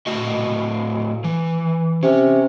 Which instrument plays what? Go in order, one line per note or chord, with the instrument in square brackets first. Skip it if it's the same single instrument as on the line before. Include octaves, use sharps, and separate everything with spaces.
[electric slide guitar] A2 F#4 D#5
E3
[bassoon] C3 [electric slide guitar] C#4